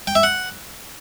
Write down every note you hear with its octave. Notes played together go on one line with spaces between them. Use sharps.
G5
E5
F#5